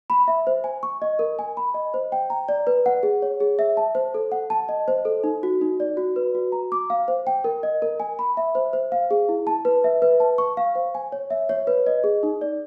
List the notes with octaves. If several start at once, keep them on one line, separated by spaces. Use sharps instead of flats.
B5
E5
C5
G#5
C#6
D#5
A#4
G#5
B5
D#5
C5
G5
A#5
D5
B4
F#5
G#4
C#5
G#4
E5
A5
C5
A4
F#5
A5
D#5
C5
A4
D#4
F#4
D#4
D5
F#4
B4
F#4
A#5
D6
F5
C5
G5
A#4
D#5
A#4
G#5
B5
E5
C5
C5
F5
G#4
E4
A5
B4
E5
B4
A5
C#6
F5
C5
G#5
C#5
E5
C#5
B4
D#5
G#4
D#4
D5